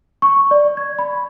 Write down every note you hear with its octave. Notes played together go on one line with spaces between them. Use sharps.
C#6
D5
G#6
B5